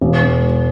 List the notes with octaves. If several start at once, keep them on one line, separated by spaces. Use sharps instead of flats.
E1